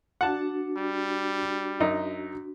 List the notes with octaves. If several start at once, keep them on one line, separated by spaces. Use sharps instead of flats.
D4 F#4 F#5 A5
G3
F#2 D#4